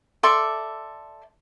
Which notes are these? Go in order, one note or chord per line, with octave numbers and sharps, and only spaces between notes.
A4 D5 E5 C6